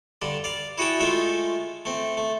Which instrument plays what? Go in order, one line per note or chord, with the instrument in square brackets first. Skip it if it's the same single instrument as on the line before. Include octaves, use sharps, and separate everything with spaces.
[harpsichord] G2 D3 D4
D5 F5
E4 F#4 G#4 G5 A5
G#3 A3 F4 E5 G5
A3 C4
A3